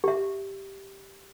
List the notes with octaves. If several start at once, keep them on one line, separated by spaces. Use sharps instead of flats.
G4 E5